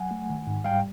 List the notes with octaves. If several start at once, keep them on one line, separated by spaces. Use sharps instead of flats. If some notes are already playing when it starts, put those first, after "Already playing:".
Already playing: F#3 F#5 G#5
A3
D#3
G#2
G3 F5 G5